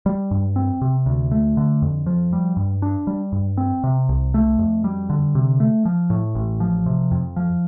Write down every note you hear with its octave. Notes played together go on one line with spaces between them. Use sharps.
G3
G2
C4
C3
D2
A3
D3
F2
F3
G3
G2
D4
G3
G2
C4
C3
C2
A3
F2
G3
D3
C3
A3
F3
A2
A1
F3
C3
F2
F3